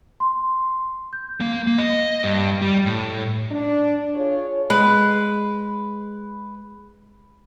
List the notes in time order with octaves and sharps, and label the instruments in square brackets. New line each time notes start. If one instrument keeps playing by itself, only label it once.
[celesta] C6
G6
[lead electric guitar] A#3
A#3
D#5
G2
G3
A2
[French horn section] D4
F4 G#4 C#5
[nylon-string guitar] G#3 [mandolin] B4